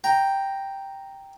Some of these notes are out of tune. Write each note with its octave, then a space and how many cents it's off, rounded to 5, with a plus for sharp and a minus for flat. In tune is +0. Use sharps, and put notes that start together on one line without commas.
G5 +0 A#5 +0